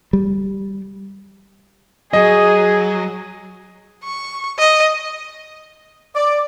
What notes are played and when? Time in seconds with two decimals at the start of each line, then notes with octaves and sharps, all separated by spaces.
0.13 G3
2.13 F#3 G#4 D#5
4.04 C#6
4.59 D#5
6.15 D5